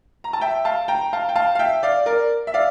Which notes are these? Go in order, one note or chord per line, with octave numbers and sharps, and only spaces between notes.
A#5
A5
E5 G5
F5 A5
G5 A#5
F5 A5
G5
F5 A5
F5
E5 G5
D5 F5
A#4 D5
E5
D5 F5